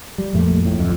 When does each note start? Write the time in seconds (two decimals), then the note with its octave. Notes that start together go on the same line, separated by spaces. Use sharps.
0.18 G3
0.33 A#1 F2 A#2 A3
0.63 E1 F2 A2
0.79 D1 F2